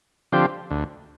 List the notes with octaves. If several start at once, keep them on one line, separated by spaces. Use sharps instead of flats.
D3 F3 C4 G4
D2